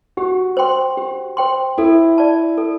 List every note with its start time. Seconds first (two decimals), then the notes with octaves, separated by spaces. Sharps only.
0.17 F#4 G4
0.57 C5 G5 C6
0.97 G4
1.37 C5 G5 C6
1.78 E4 A4
2.18 D5 A5
2.58 A4